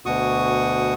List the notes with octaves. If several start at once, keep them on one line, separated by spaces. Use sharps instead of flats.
D2 B2 F#4 C#6 D#6